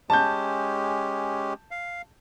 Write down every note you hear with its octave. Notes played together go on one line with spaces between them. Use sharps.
G#3 C#4 G4 A5 G6
F5